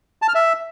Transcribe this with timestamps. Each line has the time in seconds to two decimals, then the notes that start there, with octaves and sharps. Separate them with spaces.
0.22 A5
0.28 F6
0.35 E5